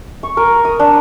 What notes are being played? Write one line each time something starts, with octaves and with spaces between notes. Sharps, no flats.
C#6
A#4
D#6
D4